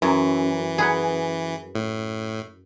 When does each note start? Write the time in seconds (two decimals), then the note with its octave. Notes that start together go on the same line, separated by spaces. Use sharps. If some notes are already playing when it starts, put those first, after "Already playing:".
0.02 F#2 E3
0.78 G#4 B4 F#5
1.75 A2